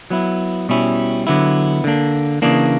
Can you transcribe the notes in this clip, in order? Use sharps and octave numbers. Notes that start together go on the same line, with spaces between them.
F#3 B3 E4
B2 G3 C#4 E4
D3 F#3 B3 E4
D3 A#3 D4
C#3 E3 A#3 D4